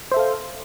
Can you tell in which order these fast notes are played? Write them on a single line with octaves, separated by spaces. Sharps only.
C5 E5 A4 F5